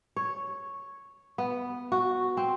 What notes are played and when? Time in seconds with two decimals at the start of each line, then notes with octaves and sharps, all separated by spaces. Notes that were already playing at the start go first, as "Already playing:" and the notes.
0.16 C#5
1.38 B3
1.92 F#4
2.37 C4